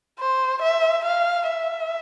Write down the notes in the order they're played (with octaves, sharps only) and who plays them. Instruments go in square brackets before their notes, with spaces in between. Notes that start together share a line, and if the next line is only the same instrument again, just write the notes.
[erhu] C5
E5
F5
E5